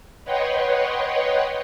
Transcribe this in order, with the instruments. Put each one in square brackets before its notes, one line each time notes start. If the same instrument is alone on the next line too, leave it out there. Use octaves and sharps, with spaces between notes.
[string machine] B4 C#5 D#5 F#5 G5 C6